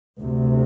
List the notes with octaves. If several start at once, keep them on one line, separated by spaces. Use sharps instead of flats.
D2 C3